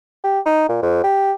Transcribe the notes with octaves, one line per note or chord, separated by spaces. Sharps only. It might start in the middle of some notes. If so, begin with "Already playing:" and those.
G4
D#4
A#2
F2
G4